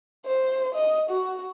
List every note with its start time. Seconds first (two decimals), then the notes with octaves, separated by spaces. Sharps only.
0.26 C5
0.74 D#5
1.10 F#4